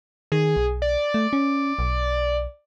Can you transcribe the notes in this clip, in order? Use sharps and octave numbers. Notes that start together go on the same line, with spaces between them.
D#3 G#4
B1
D5
A3
C#4
B1